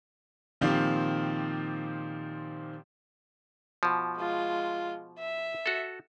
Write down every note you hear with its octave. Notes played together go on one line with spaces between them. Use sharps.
A#2 D#3 F3 C4 G4 F5
B2 F3
G#3 F4
E5
F#4 A4